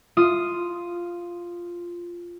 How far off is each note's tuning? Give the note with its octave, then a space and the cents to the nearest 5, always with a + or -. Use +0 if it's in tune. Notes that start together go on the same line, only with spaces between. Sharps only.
F4 -5 D#6 +0